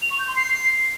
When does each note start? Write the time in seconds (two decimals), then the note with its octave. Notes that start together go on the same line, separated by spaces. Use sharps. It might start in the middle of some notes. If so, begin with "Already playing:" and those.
0.02 F7
0.11 C#6
0.19 G6
0.28 C6
0.36 C7